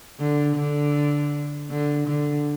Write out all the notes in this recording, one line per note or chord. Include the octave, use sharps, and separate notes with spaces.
D3
D3
D3
D3